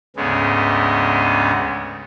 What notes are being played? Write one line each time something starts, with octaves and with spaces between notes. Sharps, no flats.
D2 G#2 C#3 G#3 B3